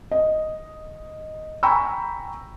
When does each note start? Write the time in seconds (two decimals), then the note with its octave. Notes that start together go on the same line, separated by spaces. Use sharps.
0.11 D#5
1.63 G5 G#5 A#5 B5 C#6 E6